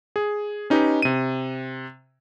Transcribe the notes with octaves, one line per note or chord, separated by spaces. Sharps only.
G#4
C#4 D#4 G4 B4 D#5
C3 D#7